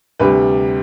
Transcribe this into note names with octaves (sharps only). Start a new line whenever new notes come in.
D2 C3 G3 B4